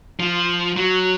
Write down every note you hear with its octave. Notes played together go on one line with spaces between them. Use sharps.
F3
F#3